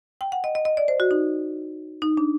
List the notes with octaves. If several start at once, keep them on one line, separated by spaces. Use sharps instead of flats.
G5
F#5
D#5
D#5
D#5
D5
C5
F#4
D#4
D#4
D4